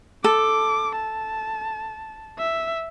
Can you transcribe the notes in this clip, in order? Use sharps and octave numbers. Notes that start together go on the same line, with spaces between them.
A4 D6
A5
E5